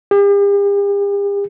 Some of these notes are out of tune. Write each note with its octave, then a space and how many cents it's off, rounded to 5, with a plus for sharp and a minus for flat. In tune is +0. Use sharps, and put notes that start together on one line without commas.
G4 +45